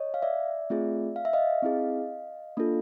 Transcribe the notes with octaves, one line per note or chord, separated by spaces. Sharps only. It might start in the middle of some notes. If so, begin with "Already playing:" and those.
Already playing: C#5 D#5
F5
D5 E5
A3 C4 F4 G#4
F5
E5
D#5 F5
C4 E4 G#4
A#3 D4 F4 A4